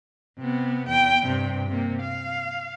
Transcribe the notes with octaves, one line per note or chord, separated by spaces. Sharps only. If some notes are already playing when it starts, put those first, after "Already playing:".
C3 B3
E2 G5
G2 C3
C3 A#3
F5